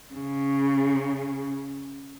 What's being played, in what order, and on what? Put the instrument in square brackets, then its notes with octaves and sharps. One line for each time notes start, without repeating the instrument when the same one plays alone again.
[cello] C#3